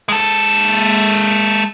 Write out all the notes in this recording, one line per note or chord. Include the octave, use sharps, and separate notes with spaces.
G#3 A4